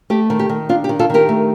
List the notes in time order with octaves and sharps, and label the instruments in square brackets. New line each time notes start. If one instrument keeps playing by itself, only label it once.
[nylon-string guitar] A3 G4
D#3
G4
D#3
D4 F4
G4
D#3
F4 A4
D#3 G4 A#4
A3